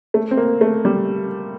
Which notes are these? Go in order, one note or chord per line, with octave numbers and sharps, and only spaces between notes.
A3
C4
A#3
A3
G3